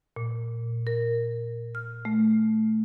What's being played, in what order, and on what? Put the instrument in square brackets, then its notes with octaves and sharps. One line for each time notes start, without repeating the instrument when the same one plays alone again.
[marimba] A#2
A#4
F6
A3